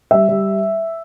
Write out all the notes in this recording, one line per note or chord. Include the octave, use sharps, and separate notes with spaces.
G3 E5
G3